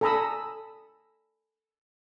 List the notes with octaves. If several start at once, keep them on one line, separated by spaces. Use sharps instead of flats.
A4 G#5 A#5 B5 D#6 E6